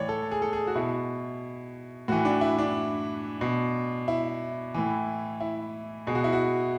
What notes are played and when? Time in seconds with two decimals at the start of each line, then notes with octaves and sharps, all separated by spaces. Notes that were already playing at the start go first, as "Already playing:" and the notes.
Already playing: A2 E3 C#5 D5
0.09 A4
0.31 G#4
0.42 A4
0.53 G#4
0.67 F#4
0.75 B2 E4
2.08 A2 E3 F#4
2.25 D4
2.41 E4
2.59 D4
3.41 B2
4.08 E4
4.74 A2 E3
5.40 E4
6.07 B2 G#4
6.15 F#4
6.24 E4
6.33 F#4